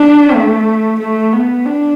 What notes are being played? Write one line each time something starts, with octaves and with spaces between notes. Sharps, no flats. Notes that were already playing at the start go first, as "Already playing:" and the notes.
Already playing: D4
A3
A3
B3
D4